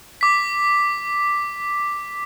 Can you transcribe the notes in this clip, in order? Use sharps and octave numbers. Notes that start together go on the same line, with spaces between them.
D6 B6